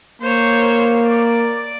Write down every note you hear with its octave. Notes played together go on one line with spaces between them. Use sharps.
A#3 C5 C#5
D5